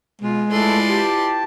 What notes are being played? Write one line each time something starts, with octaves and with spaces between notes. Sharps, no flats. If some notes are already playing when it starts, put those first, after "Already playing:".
B2 G#3 F4
A3 E4 F4 A4 B4 D5 C6
G4 A5